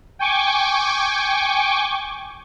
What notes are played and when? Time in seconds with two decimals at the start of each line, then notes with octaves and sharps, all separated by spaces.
0.19 G5 G#5 C#6 D6